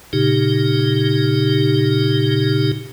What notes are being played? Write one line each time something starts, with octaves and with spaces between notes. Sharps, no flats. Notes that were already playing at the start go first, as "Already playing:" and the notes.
A#2 C#3 D#4 G4